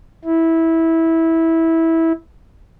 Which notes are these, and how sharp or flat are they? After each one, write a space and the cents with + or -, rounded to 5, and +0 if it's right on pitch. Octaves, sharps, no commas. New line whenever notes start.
E4 -15